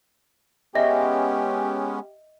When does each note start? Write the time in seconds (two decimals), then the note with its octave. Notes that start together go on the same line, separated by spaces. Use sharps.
0.75 G#3 B3 C#4 G4 D#5 E5